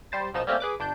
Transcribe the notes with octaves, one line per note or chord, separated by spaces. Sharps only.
G3 C5 A6
A#1 B2 F3 D#4 E7
G3 A3 A#3 C4 C#4 G4
G#4 B4 D6
G1 D4 G6